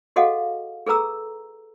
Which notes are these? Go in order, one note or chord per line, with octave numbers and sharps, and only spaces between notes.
F#4 G#4 A4 D#5 F5 F#5
G#4 A4 B4 A#5 E6